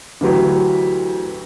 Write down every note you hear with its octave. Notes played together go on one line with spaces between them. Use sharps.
D2 E3 F#3 G4